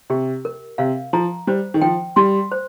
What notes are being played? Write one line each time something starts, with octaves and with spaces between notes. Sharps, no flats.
C3 G4
A#4
C3 F5
F3 A#5
G3 C5
D#3
F3 G5
G3 C6
C5